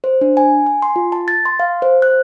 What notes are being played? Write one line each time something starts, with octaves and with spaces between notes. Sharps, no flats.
C5
D4
G#5
G#5
C6
F4
A5
A6
C6
F5
C5
F#6